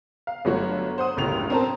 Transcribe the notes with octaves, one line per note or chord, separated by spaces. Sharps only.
F5
G1 F#3 A3 F#4 C#5
C5 F#5 D#6
G1 C#2 F#2 A2 G4 F7
C4 C#4 A#4 C5 A5